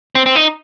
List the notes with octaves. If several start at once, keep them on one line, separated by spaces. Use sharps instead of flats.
C4
C4
D#4